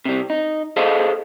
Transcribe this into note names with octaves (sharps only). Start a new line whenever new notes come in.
C3 G3
D#4
G#4 A4 C5 D#5 F5 A5